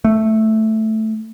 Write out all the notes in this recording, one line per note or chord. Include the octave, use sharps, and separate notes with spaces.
A3